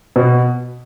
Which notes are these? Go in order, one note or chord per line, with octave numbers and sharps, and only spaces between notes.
B2